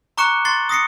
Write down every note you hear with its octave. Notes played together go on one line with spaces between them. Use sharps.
A#5 C#6 D6 F#6 C#7 E7
C6 A6 C7 G7
D#6 A#6 C7 C#7